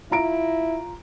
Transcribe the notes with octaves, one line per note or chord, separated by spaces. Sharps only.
E4 F4 A#5 D7